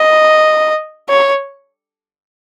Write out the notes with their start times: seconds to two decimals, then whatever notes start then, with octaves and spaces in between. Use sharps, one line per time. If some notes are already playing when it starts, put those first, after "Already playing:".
Already playing: D#5
1.09 C#5